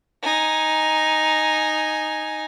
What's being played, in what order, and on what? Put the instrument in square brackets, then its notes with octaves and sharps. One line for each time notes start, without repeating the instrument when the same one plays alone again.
[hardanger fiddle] D#4 G#5